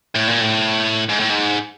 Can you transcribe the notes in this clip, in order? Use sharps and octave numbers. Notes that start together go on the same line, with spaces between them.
A2
A#2
A2
G#2
A2
G#2